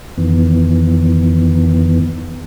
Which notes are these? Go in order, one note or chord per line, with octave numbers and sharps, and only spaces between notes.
F2 D#3 E3 B3